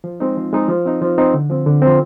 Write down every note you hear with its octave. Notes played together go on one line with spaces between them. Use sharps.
F3
G#3 C4 D#4
F3
G#3 C4 D#4
F3
C4 D#4
F3
C4 D#4
D3
F3 C4
D3
C4
F3